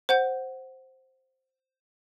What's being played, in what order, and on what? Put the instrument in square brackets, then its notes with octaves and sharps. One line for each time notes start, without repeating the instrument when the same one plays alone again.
[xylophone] C5 F#5 G6